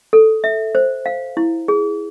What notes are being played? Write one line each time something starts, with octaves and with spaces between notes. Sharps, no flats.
A4
E5
C5
F5
E4
G#4